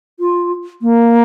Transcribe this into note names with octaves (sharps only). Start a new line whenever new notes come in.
F4
A#3